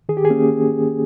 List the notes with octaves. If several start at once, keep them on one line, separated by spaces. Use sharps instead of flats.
D#3 G#4
G4
G#4
A#3 C#4